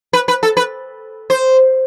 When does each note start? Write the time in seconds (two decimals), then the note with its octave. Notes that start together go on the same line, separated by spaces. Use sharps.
0.13 B4
0.28 B4
0.43 A4
0.57 B4
1.30 C5